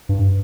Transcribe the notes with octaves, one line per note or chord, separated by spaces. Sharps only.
G2